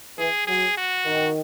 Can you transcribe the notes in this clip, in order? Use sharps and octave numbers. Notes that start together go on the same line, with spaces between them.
E3 G#4
F#3 G#4
F#4
D#3